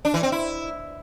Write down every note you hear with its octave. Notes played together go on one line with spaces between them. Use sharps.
D4
E3
C4
E4